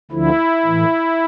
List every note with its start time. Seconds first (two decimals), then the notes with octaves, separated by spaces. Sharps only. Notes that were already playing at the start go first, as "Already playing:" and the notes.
0.11 D2 D3 F3 E4
0.65 A2 E3